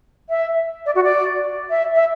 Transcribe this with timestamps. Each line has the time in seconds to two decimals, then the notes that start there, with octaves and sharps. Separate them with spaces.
0.29 E5
0.86 D5
0.95 F#4
1.04 D5
1.70 E5
1.95 E5